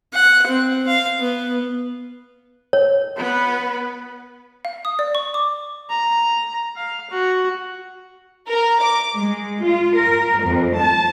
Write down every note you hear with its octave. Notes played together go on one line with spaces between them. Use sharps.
F#5
C4
F5
B3
C#5
B3 B4
F5
D#6
D5
C#6
D6
A#5
F5
F#4
A#4
D6
G#3
F4
A#4
F2
A5